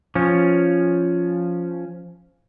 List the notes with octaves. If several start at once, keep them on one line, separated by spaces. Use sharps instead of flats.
F3 C#4